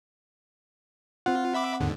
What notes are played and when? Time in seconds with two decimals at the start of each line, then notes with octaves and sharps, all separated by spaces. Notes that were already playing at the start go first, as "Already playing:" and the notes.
1.26 C4 F4 F#5
1.54 E5 B5 D6
1.80 D#2 G#2 D3